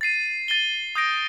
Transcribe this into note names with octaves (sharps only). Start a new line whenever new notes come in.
A6 C7 D#7
A6 D#7 G7
D#6 G6 A#6 D7